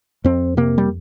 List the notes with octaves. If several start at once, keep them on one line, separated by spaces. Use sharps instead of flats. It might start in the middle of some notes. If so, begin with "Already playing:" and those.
F2 C4
C3 A#3
G3